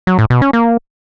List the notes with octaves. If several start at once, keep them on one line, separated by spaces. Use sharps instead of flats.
F#3
A2
B2
C#4
A#3